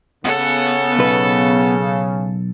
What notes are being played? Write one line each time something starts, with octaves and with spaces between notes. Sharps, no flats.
C#3 B3 A4 F#5
B1 B4